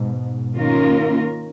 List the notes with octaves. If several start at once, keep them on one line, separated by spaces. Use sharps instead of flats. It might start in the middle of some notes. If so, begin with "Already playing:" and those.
Already playing: G#2 B2
D#3 A#3 C#4 F4 A#4